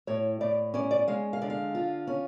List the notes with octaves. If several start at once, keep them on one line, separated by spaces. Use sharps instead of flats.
A2 C#5
A2 D5
C#4 D5
D5
G#3 F5
F5
D3 D5
F5
F4
C#4